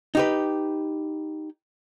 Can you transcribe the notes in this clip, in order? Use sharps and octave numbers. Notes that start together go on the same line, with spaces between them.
D#4 G4 B4